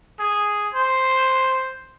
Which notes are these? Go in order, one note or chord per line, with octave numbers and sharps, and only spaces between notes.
G#4
C5